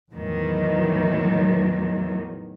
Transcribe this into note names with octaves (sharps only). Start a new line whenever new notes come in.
E2 A2 D#3 E3 F#3